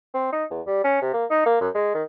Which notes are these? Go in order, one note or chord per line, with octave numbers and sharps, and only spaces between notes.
C4
D#4
E2
G3
C#4
C3
A#3
D#4
A#3
F#2
G#3
D#3